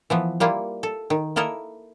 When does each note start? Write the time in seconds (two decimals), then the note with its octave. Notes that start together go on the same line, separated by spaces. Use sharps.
0.10 E3 F3 B3
0.40 G3 A#3 E4 F4
0.83 A4
1.10 D#3
1.36 A#3 E4 A4 A#4 D#5